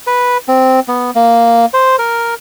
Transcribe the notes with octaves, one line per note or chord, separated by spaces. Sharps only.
B4
C4
B3
A#3
C5
A#4